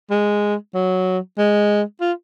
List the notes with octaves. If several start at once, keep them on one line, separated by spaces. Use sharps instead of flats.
G#3
F#3
G#3
F4